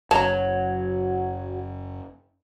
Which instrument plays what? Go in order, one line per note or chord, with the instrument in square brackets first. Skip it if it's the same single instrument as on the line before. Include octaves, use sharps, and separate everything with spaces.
[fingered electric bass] F#1 F#2 [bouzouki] F#3 [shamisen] A5 A#5